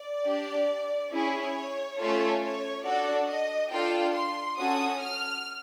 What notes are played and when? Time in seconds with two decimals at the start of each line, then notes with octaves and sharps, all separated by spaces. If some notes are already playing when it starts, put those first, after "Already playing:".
Already playing: D5
0.25 D4 G4
1.11 C#4 E4 G#4 C#5
1.98 A3 C#4 F4 A4
2.41 C#5
2.84 D4 F#4 A4 D5
3.28 D#5
3.71 D4 F4 A4 G5
4.14 C6
4.57 C#4 F#4 A4 D#6
5.01 F6